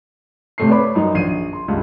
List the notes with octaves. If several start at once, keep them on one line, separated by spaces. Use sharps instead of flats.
C3 A3 C7
B4 C#5 D5 B5 D6
F#2 D#4
A#1 C7 D#7
C6
C#2 G2 G3